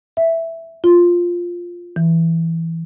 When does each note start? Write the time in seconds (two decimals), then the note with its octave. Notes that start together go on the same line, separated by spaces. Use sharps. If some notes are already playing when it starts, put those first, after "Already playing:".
0.17 E5
0.84 F4
1.96 E3